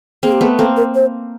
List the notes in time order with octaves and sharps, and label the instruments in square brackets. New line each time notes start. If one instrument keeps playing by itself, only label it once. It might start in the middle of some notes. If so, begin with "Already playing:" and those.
[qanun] A#3 C4 [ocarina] G#4
[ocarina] G4
[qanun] A3 B3 [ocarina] G#4
[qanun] A#3 C4 [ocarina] A4
[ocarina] A#4
C5